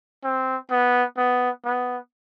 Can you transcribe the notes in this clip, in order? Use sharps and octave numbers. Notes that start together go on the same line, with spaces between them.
C4
B3
B3
B3